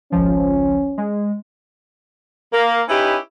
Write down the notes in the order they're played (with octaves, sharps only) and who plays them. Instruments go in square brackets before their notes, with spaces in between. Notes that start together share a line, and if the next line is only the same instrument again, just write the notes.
[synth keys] G#1 C#2 F3 [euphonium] C#4
[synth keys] G#3
[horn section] A#3
C#4 D#4 E4 G4 B4